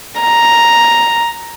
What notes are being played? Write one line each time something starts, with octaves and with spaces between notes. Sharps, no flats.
A#5